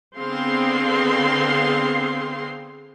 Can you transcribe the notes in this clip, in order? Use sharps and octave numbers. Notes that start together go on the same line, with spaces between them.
D3 B3 C4 G#4 F5 C6